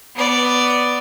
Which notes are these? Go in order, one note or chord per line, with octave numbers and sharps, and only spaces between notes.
B3 D5